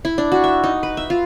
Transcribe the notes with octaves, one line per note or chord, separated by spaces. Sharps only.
E4
D4
F#4
E5
D#4
B4
E5
F4